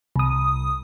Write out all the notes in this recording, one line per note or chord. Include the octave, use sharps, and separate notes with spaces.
C2 D#6